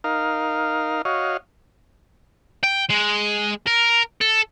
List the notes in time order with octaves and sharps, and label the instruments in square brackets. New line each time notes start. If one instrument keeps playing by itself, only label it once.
[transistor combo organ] D#4 A#4 F5
F#4 C#5 D#5 F5
[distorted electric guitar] G5
G#3
A#4
A4